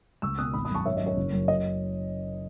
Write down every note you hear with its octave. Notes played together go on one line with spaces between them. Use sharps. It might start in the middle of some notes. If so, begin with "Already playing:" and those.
C#2 C#6 E6
B2 D#6 F#6
G#1 B5 D#6
F#2 B5 D#6
A5 C#6
G#1 C#5 E5
F#2 D#5
C#5
F#1
F#2
D#5